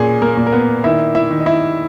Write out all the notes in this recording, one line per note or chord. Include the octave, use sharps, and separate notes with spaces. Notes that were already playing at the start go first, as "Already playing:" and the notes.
Already playing: A#2 C#4 G#4
A#3 A#4
A#2
A#4
B3 B4
D#3 E4 E5
E4 E5
D#3
D#5
E4 E5